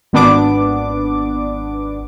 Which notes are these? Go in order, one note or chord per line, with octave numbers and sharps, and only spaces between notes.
G#1 B3 D4 D6